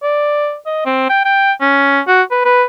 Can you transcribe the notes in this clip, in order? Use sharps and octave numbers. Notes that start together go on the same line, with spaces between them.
D5
D#5
C4
G5
G5
C#4
F#4
B4
B4